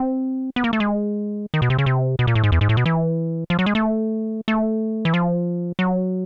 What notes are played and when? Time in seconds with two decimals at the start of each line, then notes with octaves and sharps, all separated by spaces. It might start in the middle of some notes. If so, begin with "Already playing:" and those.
Already playing: C4
0.56 B3
0.64 A#3
0.73 A3
0.80 G#3
1.54 D#3
1.62 B2
1.70 C3
1.78 C#3
1.86 C3
2.19 B2
2.27 A#2
2.35 A2
2.44 G#2
2.52 E2
2.61 G#2
2.69 A2
2.77 B2
2.86 E3
3.50 F3
3.59 F#3
3.66 G#3
3.75 A3
4.48 A3
5.05 E3
5.14 F3
5.79 F#3